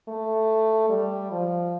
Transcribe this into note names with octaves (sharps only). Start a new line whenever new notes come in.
A3
G3
F3